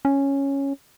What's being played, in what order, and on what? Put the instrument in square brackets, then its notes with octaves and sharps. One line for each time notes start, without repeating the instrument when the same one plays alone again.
[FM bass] C#4